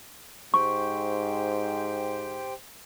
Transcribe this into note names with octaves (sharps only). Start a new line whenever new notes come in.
G#2 G4 C5 G5 C#6